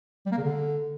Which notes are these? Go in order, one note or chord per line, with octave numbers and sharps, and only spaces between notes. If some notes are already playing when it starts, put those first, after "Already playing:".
G3
A#3
C#3
D3